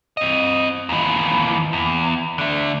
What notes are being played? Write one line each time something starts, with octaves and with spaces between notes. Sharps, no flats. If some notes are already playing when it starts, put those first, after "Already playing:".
C4 D#5
D#2 E3
E2
D3 A3